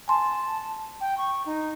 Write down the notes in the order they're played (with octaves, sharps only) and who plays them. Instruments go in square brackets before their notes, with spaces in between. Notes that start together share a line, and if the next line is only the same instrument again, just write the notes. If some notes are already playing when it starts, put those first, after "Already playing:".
[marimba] G#5 C6 [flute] A5
[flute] G5
C#6
D#4